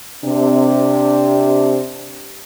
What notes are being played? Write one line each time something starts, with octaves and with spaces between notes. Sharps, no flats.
C3 D4